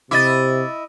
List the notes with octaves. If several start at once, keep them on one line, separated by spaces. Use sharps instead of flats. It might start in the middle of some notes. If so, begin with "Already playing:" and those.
C3 E4 D#5 D6 A6